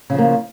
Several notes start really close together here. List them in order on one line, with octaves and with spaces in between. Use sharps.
C#3 F3 A#3